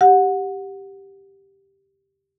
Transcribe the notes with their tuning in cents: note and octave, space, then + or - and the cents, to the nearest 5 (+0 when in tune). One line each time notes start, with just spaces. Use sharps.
G4 +0 F#5 -20